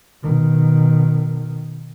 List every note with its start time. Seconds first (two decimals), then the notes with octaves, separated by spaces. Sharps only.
0.22 B2 D#3